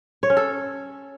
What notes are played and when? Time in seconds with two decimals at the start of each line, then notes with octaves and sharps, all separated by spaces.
0.23 C#5
0.30 C#4
0.37 A4